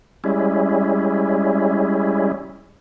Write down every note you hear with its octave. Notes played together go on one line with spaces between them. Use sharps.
G3 G#3 C#4 E4